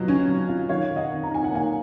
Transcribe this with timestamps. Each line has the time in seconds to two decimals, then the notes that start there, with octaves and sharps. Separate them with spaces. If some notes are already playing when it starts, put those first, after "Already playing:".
Already playing: B2 F#3 F4
0.08 C#4
0.29 F#3
0.49 F4
0.69 D#3 C#5 F5
0.89 D#3
0.96 D#5 F#5
1.10 D#3
1.23 A#5
1.30 D#3 G#5
1.44 F#5
1.51 A#3 F5 G#5